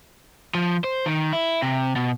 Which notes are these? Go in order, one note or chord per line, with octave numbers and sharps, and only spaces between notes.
F3
C5
D#3
E4
C3
B2